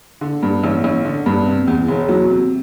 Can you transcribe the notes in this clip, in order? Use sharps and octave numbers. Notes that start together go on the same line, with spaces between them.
D3
G2
A1
A1
D3
G2
C3
E2
E1
F#3
C3